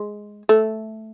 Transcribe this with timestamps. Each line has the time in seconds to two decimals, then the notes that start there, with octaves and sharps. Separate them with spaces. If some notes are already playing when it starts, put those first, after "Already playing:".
Already playing: G#3
0.49 A3